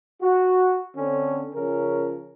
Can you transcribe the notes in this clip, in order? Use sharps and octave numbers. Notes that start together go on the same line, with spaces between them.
F#4
D3 C4 C#4
C#3 F3 C#4 A#4